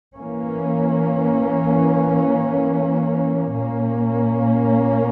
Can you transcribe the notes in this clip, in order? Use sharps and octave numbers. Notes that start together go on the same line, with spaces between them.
E3 A#3 C#4
A#2 A#3 C#4